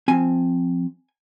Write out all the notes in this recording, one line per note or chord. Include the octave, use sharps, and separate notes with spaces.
F3 C4 G#5